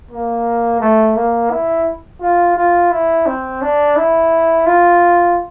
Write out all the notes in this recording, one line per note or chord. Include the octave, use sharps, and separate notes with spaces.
A#3
A3
A#3
E4
F4
F4
E4
C4
D4
E4
F4